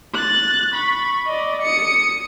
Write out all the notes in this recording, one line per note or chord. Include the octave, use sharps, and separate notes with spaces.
F#6 A6
B5 C#6
D5 D#5
D#6 C#7